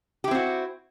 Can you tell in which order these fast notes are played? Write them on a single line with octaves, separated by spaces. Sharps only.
G4 E4 C4 F#4